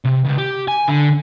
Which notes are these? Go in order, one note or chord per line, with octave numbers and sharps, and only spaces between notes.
C3
C#2
G4
G#5
D3